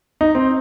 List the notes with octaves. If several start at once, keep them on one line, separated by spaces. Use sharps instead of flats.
D#4
C4